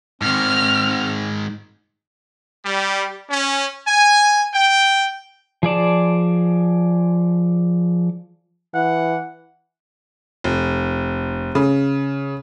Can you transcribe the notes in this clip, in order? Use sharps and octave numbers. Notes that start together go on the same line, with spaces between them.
G#2 D#3 C4 F6
G3
C#4
G#5
G5
F3 G#4 D5 A5
E3 F#5
F1
C#3